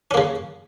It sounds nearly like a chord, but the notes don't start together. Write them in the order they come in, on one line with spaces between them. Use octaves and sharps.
C#4 A#3 C#3